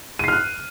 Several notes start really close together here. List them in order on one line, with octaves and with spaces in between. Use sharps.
D#7 C7 F6 F#6